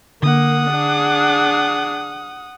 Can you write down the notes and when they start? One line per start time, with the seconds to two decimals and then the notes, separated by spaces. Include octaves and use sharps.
0.23 D3 A#3 F#5 D#6
0.71 D4 G#4